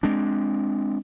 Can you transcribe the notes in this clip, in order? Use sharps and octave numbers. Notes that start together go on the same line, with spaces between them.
G#3 C4 D4